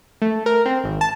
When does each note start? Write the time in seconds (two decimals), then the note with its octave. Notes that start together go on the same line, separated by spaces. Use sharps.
0.22 A3
0.46 A#4
0.66 C4
0.84 G#1
1.01 A5